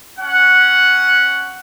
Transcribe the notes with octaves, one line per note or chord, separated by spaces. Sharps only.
C#4 F#5